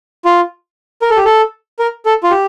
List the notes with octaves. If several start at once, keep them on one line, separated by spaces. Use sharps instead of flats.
F4
A#4
A4
G4
A4
A#4
A4
F4
G4